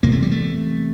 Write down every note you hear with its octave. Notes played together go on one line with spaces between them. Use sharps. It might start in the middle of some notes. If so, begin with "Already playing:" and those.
E2 C3 A#3
A3
G3
A3